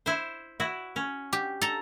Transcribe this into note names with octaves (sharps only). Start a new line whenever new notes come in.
E4 C5
E4 F#4
C#4
G4
A4 A#5